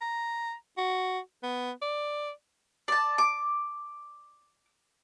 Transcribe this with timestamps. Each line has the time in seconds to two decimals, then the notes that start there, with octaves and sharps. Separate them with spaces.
0.02 A#5
0.78 F#4
1.43 B3
1.82 D5
2.88 D5 A5
3.18 D6